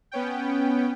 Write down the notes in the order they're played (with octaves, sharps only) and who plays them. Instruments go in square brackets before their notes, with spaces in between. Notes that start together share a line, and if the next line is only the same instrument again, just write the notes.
[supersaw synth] B3 C#4 G5